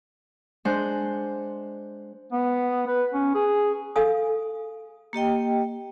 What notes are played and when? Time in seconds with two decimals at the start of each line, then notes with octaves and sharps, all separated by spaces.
0.65 G#3 D4 C5 F#5
2.32 B3
2.87 B4
3.13 C#4
3.35 G#4
3.96 A4 F5 G#5 D#6
5.13 A#3 G4 D#5 G5